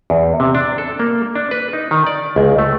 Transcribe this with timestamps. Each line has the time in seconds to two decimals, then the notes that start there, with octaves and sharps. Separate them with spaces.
0.10 E2
0.40 C3
0.55 D4
0.78 A4
0.99 A#3
1.35 D4
1.51 B4
1.73 D#4
1.91 D#3
2.07 D5
2.36 C#2
2.58 A3